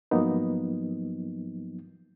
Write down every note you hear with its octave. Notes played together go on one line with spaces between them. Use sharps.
G#2 F3 F#3 A#3 B3 D#4